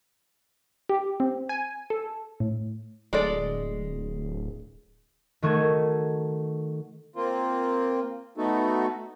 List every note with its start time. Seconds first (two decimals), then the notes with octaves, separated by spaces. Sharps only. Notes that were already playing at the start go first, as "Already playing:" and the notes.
0.89 G4
1.20 C4
1.49 G#5
1.90 A4
2.40 A2
3.13 D1 G#3 A4 D5
5.42 D#3 A3 F#4 C#6 G#6 D#7
7.16 A#3 C4 F4
8.38 A3 B3 D#4 F#4 A4